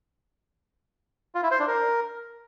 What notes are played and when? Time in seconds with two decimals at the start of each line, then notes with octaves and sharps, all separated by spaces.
1.35 F4
1.43 E4
1.51 C5
1.59 D4
1.68 A#4